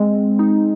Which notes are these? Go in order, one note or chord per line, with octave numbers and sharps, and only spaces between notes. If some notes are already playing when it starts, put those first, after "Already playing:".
Already playing: G#3 C4
D#4